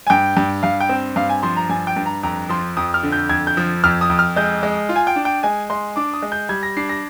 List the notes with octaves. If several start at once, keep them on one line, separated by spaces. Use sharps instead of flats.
G#5
G2 G5
G2
G2 F5
G5
C4
G2 F5
G#5
F3 C6
A#5
G2 G#5
G5
G2
A#5
F2 A#5
F3 C6
F2 D#6
F6
D3
G6
F2 G#6
G6
F3
F2 F6
D#6
F2
F6
G#3 G6
G#3
F4
G#5
G5
D4
G5
G#3 G#5
G#3 C6
D4 D6
D#6
G#3
G6
G3 G#6
A#6
D4 C7
A#6